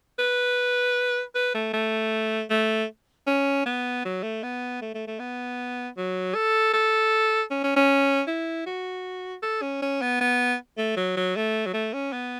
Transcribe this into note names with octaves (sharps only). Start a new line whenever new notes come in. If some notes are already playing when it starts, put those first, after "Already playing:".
B4
B4
A3
A3
A3
C#4
B3
F#3
A3
B3
A3
A3
A3
B3
F#3
A4
A4
C#4
C#4
C#4
E4
F#4
A4
C#4
C#4
B3
B3
A3
F#3
F#3
A3
F#3
A3
C#4
B3